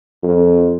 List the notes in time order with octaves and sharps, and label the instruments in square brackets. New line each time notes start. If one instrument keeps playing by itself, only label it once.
[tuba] F2